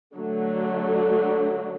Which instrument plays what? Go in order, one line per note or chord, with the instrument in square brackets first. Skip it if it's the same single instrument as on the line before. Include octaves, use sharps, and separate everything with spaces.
[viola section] D3 F#3 A3